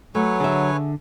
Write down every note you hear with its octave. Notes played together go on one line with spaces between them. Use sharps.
F#3 A3 B4 C#5 G#5
D3 G#4 E5